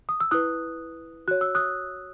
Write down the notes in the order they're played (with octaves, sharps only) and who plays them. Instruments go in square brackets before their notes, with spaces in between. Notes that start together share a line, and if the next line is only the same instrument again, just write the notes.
[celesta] D#6
E6
E4 B4 D#6 F#6
F#4 C#5 F#6
E6
D#6 F#6